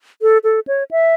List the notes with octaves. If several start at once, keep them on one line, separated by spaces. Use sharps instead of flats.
A4
A4
C#5
E5